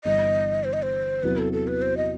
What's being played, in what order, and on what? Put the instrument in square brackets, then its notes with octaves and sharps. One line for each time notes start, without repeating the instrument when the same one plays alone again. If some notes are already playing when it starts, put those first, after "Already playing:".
[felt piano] G1 G2 E3 B3 [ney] D#5
[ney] C5
D#5
C5
[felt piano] E2 C3 F#3 B3 E4 [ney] B4
[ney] A4
A4
B4
C5
D#5